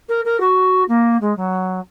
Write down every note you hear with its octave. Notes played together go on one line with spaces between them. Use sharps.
A#4
A#4
F#4
A#3
G#3
F#3